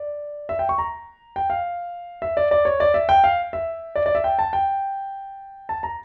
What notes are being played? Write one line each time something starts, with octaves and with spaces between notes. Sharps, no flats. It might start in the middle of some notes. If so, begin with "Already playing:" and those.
Already playing: D5
E5
G5
C#6
A#5
G5
F5
E5
D5
D5
C#5
D5
E5
G5
F5
E5
D5
D5
E5
G5
A5
G5
A5
A#5